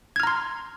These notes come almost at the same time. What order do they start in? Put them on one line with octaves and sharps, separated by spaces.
G#6 F6 A#5 C6